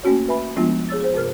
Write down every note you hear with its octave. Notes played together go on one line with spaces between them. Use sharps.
A3 A#3 C#4 F#4 C#5
B4 E5 G#5 B5
F3 G#3 A3 B3 D4 F4
G#4 C#5 E6 A6
G#4 C5
G2 C3 A#4 F6